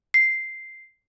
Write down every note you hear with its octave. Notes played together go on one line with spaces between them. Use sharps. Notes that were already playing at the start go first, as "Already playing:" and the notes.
C7